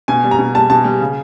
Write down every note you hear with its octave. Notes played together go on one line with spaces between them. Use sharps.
B2 G#5
G3
A#5
B2
G3 A5
B2 A5
G3
C#3